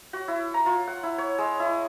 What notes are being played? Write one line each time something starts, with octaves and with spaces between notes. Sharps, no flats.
F#4
E4
A#5
F4
F#5
E4
C#5
G#3
E4